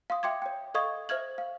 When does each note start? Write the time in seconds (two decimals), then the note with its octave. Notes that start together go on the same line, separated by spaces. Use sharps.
0.10 F5 C6 D#6
0.23 E5 G5 C6 D6 G#6
0.42 C#5 G5
0.74 A4 D#5 F5 C#6 D#6 G#6
1.09 C5 E5 F6 G#6 F#7
1.38 F5